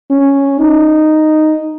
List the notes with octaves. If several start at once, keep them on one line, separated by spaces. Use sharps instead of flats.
C#4
D#4